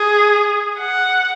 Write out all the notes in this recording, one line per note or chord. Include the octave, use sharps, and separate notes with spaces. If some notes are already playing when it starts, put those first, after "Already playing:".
Already playing: G#4
F#5